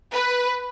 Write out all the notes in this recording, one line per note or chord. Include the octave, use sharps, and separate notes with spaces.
B4